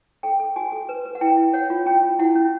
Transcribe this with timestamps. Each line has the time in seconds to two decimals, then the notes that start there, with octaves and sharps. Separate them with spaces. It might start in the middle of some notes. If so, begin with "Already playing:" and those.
0.23 A4 G5
0.40 A4
0.56 F#4 G#5
0.72 A4
0.89 B4
1.05 B4
1.15 F#5
1.21 E4 G5
1.37 E4
1.53 C#5 F#5
1.70 F4
1.86 C#4 G5
2.03 F4
2.19 E4 F#5
2.36 C#4